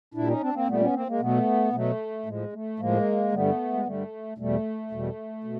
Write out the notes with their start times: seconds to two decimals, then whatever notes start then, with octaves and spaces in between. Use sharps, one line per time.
0.14 A#2 G3 D4 E4
0.28 C#4 D#4
0.40 C4 D4
0.54 A#3 C4
0.67 A#2 G3 A3 B3
0.80 B3 C#4
0.94 A#3 C4
1.07 G#3 A#3
1.20 B2 F#3 A3 B3
1.73 B2 F#3 A3
2.26 A2 F3 G#3
2.53 A3
2.79 A2 F3 G#3 A#3
3.32 G2 D3 G3 A3 B3
3.73 G#3
3.85 G2 D3 G3 A3
4.38 E2 B2 G3 A3
4.91 E2 B2 G3
5.44 B2